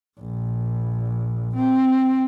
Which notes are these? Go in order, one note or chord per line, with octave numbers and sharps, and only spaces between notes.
A#1
C4